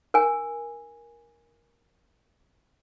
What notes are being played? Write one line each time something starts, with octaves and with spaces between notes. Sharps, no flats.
A#4 G#5